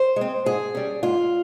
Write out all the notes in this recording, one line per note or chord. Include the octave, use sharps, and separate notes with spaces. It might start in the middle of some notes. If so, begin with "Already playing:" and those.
Already playing: C5
G#3 C4
G#2 G#4
G3 C#4
G#2 F4